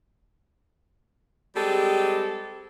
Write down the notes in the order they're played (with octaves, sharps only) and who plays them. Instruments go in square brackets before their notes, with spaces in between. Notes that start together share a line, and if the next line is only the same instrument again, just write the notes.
[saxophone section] G3 G#3 C4 G4 A4